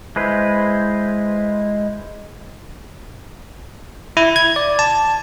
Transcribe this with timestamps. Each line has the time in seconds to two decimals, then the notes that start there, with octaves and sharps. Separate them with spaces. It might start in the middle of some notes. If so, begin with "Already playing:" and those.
0.16 G#3 E4 B4 C5
4.17 E4
4.36 G#6
4.56 D5
4.79 A5